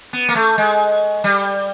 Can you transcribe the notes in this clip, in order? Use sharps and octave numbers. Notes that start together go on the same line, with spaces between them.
B3
A#3
A3
G#3
G3